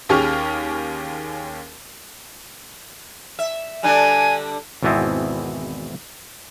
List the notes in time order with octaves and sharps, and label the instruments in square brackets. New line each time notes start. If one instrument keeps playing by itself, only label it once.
[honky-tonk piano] D#2 C#4 G4 G#4 C#6 F6
[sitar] E5
[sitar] D3 G3 D4 [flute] G#5
[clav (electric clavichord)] G#1 E2 B2 E3 B3 C4